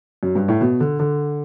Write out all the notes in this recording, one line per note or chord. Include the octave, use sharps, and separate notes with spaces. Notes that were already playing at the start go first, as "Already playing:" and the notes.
F#2
G2
A2
B2
D3
D3